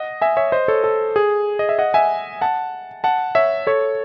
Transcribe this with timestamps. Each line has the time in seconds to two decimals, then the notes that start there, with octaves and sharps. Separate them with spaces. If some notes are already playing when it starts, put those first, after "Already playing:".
Already playing: D#5 F#5
0.22 E5 G#5
0.37 C#5 E5
0.52 C5 D#5
0.68 A4 C#5
0.84 A4
1.16 G#4
1.59 D#5
1.69 E5
1.79 D#5 F#5
1.94 E5 G#5
2.41 F#5 A5
3.04 F#5 A5
3.35 C#5 E5
3.67 A4 C#5